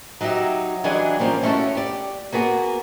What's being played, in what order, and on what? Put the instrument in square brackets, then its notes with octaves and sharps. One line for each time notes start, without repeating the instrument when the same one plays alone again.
[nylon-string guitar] F#3 D#4 F#4 G4 E5
E3 F#3 G3 D4 G#4 D#5
F3 G3 A#3 C4 C#4
A3 C#4 D#4 E4 F#4 A4
G4 D5
A#3 B3 F#4 G#4